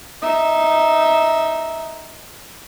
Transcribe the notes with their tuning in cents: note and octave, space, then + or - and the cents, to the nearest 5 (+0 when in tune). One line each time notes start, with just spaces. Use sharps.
D#4 +0 E5 -15